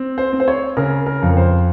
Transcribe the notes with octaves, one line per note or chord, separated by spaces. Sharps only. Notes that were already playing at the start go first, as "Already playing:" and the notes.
Already playing: C4
C5
C4
C5
C#5
C#3 A#4
A#4
F2
C5